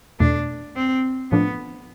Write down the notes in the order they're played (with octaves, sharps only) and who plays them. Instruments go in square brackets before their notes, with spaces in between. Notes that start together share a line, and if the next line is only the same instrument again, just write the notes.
[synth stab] E2 B2 A3 [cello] D4
[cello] C4
[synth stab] A2 F3 A3 D4 [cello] B3